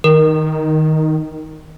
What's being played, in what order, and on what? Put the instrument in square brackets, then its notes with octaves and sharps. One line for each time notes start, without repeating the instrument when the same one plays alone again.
[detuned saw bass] D#3 [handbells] A#4